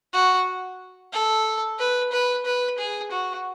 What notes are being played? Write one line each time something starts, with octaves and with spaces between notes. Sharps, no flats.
F#4
A4
B4
B4
B4
G#4
F#4